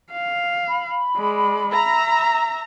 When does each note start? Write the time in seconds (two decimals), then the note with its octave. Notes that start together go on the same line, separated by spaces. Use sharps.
0.11 F5
0.67 B5
1.17 G#3 D5
1.73 E5 A#5